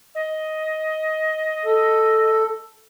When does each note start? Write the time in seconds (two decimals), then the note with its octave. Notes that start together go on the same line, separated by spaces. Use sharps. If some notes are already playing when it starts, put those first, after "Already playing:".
0.14 D#5
1.65 A4